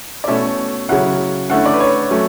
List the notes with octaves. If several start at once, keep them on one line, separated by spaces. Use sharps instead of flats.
D5
B2 A3 C#4 E4 E5
C#3 F#3 C#4 E4 F#5
D3 A3 C#4 E4 F#5
D5
B4
C#5
F#3 A3 C#4